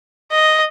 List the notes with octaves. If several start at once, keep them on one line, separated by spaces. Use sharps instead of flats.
D#5